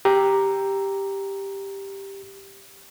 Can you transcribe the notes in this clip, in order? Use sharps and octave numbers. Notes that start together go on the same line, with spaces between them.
G4 A#5